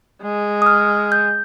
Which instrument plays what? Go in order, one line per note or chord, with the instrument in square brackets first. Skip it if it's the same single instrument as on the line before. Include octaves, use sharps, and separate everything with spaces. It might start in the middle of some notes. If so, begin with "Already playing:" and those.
[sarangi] G#3
[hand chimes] D#6 F6
G6